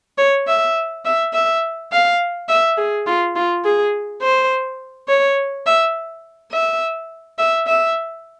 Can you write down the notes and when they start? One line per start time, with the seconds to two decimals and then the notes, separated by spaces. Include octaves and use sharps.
0.18 C#5
0.47 E5
1.05 E5
1.33 E5
1.92 F5
2.49 E5
2.77 G#4
3.07 F4
3.36 F4
3.65 G#4
4.22 C5
5.08 C#5
5.66 E5
6.52 E5
7.39 E5
7.67 E5